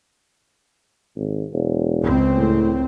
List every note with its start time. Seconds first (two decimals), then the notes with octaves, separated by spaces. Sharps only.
1.16 G#1
1.53 E1
2.02 C#2 C4
2.37 A2